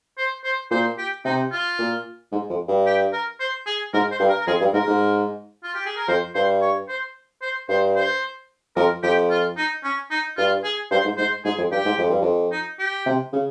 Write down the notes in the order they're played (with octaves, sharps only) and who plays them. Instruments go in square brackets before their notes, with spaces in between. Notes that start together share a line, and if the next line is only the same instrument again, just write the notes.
[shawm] C5
C5
[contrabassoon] A#2 [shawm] C5
[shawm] G4
[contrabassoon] C3 [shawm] D#4
[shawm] F4
[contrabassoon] A#2
G#2
F2
G2
[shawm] G4
A#4
C5
G#4
[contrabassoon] G#2 [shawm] A#4
[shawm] C5
[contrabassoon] G2
[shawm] A#4
A#4
[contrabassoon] F2 [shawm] G#4
[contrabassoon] G2
[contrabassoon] G#2 [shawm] A#4
[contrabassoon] G#2
[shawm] F4
G4
G#4
A#4
[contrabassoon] F2 [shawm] C5
[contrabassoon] G2 [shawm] C5
[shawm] C#5
C5
C5
[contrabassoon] G2 [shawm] C5
[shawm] C5
[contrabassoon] F2 [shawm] A#4
[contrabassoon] F2 [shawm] G4
[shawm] F4
D#4
C#4
D#4
[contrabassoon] G2 [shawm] F4
[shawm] G#4
[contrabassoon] G2 [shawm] C5
[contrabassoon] G#2
[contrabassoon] G#2 [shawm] C5
[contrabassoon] G#2 [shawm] G#4
[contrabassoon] F2
[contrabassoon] G2 [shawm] G4
[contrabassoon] G#2
F2
G2
F2
[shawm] D#4
G4
[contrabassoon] C3
C#3